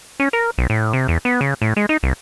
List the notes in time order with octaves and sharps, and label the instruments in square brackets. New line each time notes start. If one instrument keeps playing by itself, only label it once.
[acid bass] C#4
A#4
B1
A2
C3
E2
B3
C#3
A2
G#3
D#4
C2